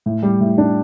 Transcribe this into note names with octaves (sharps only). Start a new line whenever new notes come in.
A2
G3
A2
D4